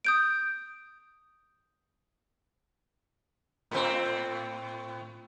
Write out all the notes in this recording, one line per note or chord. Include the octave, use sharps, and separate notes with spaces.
D#6 G6 D7
A2 C4